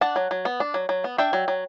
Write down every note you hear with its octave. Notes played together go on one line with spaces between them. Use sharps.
D4 F#5 A5
F#3
F#3
B3
D4
F#3
F#3
B3
D4 E5 G5
F#3
F#3